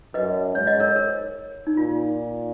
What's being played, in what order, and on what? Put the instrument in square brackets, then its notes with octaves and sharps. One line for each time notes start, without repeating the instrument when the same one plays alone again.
[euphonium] F#2 [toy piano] B4 D#5
[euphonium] G#2 [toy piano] C#5
[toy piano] D#5
A#4 C#5
A#4
D#4
[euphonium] A#2 [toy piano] F4